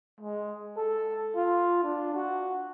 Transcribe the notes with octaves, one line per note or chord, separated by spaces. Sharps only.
G#3
A4
F4
D4
F#4